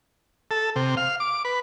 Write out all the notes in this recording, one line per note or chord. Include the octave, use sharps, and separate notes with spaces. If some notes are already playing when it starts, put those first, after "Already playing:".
A4
C3
F5
D6
B4